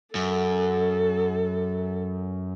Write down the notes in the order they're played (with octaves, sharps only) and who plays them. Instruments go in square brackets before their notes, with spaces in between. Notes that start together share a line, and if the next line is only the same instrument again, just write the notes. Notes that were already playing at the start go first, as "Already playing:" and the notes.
[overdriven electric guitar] F#2 [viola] A4